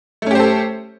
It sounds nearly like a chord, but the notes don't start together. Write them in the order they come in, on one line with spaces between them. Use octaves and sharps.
A3 C#4 G4 C5 A4